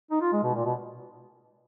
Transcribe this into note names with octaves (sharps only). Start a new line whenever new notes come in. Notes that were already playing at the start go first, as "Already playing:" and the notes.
D#4
F4
G#3
B2
A#2
B2